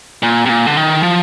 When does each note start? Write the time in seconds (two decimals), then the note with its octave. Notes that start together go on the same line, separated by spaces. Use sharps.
0.23 A#2
0.46 C3
0.49 A#2
0.67 D3
0.77 D#3
1.03 F3